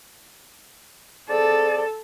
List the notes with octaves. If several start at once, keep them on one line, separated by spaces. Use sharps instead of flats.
C4 G#4 A4 D5